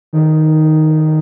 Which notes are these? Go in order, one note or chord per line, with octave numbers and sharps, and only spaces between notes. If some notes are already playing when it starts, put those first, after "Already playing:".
D#3